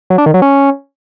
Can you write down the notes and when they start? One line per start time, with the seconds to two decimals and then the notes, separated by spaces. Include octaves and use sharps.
0.10 F#3
0.18 D4
0.26 D#3
0.34 F#3
0.42 C#4